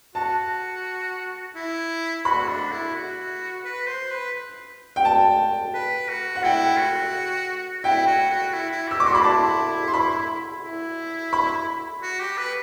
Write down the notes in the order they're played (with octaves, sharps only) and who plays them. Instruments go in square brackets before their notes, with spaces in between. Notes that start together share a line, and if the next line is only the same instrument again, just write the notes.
[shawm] F#4 [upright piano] A5
[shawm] E4
[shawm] F#4 [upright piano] B5
[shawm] D4
E4
F#4
B4
C5
B4
[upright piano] G5
A5
[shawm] B4
F#4
[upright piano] F#5
[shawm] E4 [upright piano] G5
[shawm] F#4
[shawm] E4 [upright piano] G5
[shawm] F#4
F#4
E4
E4
[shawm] G4 [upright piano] E6
[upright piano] D6
[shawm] F#4 [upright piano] C6
[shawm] E4 [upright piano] B5
[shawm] D4 [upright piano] A5
[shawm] E4
[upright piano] C6
B5
[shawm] E4
[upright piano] B5
[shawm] F#4
G4
B4